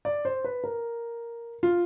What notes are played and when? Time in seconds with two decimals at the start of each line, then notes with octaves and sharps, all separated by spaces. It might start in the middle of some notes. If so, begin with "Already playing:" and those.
0.05 D5
0.25 C5
0.44 B4
0.64 A#4
1.63 F4